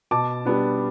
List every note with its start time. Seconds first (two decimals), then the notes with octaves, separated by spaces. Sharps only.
0.11 B2 A5 D6
0.45 G3 B3 D4